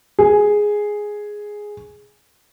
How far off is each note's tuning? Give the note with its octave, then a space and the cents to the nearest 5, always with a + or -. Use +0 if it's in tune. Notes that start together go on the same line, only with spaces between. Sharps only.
G#4 +0